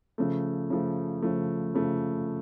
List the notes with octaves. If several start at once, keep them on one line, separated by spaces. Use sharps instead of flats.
C#3 F3 A3
C#3 F3 A3
C#3 F3 A3
C#3 F3 A3